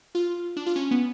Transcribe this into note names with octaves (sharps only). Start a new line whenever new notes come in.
F4
D4
F4
C#4
B3